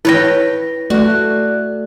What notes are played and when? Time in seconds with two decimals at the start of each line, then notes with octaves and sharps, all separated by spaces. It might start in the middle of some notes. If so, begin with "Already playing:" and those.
0.05 E4 B4 C#5 G5 A#6
0.90 A3 F#4 D5 F#6